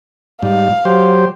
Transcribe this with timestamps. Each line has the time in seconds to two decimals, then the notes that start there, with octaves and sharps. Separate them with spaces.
0.43 G#2 G3 F5
0.85 F#3 G4 C5